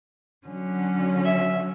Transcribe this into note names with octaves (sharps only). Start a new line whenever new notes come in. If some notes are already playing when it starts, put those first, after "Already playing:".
D3 F#3 C#4
E5